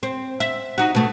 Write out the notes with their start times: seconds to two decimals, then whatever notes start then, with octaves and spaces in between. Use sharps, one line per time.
0.03 C4
0.40 E5
0.78 D#4 F#4
0.95 B2 A3